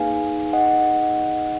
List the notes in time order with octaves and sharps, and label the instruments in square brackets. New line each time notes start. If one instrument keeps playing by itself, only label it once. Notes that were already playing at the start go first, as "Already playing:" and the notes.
Already playing: [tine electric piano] A#3 D#4 G#4 B4 [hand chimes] F5 G#5
[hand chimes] D#5 F#5